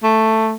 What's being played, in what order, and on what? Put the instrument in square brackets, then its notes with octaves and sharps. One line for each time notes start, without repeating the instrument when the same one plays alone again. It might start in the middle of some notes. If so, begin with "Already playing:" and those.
[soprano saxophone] A3